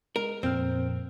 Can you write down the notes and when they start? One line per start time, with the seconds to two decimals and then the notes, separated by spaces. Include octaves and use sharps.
0.16 G#3 A#4
0.43 F2 A#2 C4 F6